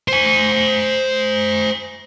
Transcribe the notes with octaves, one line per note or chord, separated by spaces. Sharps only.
C5 G#5